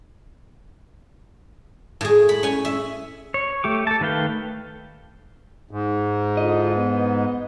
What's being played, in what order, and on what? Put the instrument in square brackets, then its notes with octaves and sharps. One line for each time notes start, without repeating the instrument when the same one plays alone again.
[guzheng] A2 G#4
B5
C#4 G#5
E5
[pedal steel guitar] C#5
A3 G4 D6
A4 A5
D#3 A3 B4 F5 G5
[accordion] G#2
[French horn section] D3 E4 F4 [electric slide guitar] D#5
[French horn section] B3